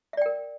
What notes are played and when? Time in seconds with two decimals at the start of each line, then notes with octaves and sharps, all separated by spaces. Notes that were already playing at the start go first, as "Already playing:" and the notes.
0.13 E5
0.17 D5
0.21 G5
0.26 A#4